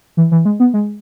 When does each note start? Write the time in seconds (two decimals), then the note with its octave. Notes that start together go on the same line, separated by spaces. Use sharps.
0.17 E3
0.32 E3
0.45 G#3
0.60 B3
0.74 G#3